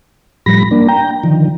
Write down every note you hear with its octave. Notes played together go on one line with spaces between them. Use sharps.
A2 F3 G3 B5 A#6
A#3 D4
G5 A#5
D3 D#3 F3